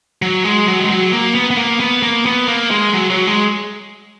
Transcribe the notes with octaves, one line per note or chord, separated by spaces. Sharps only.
F#3
G#3
F#3
G#3
F#3
A#3
B3
B3
A#3
B3
A#3
B3
A#3
G#3
F#3
F#3
G#3